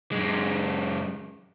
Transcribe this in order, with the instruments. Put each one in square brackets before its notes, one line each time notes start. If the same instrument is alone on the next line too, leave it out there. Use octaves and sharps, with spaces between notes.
[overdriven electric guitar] F#2 G#3